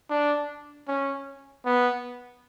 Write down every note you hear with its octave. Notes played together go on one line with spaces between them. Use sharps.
D4
C#4
B3